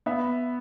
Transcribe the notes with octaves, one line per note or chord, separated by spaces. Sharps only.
B3 E5